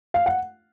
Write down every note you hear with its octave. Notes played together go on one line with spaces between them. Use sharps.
F5
F#5